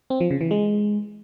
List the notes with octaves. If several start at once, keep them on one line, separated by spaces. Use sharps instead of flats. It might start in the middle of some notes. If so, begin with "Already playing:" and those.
C4
F3
C#3
E3
G#3